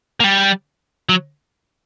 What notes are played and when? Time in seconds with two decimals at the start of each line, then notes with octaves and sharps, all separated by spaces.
0.20 A#3
0.24 G3
1.09 F#3